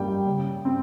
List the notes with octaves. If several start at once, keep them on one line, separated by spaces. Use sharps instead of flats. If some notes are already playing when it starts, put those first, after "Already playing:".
Already playing: G3 A#3 G5
C#3
C4